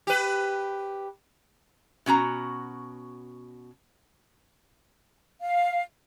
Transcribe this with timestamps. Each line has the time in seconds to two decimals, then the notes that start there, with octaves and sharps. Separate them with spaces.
0.07 G4 B4
2.06 B2 C#4 F#4 A#5
5.40 F5